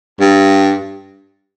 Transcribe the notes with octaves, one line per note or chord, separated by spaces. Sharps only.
G2